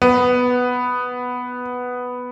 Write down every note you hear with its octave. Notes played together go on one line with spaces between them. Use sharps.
B3